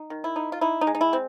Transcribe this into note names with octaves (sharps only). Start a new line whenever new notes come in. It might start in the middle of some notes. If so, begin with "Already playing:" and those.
Already playing: D#4
D#3
E4
D#4
F4
D#4 E4
D#4
G#3
D#4
E4
C4